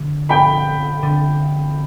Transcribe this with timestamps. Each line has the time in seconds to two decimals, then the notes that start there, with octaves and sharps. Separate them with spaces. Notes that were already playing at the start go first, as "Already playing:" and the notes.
Already playing: D3
0.29 G5 B5
1.03 D3